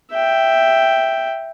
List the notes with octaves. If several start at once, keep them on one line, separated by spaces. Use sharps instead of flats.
E5 G5